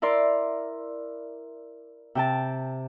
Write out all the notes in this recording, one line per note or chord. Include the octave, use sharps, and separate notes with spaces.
E4 A#4 D5 C6
C3 G5 A5